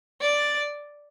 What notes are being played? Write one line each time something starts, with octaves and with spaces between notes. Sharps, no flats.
D5